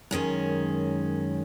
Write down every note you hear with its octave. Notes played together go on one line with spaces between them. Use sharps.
F#2 D#3 G#3 C#4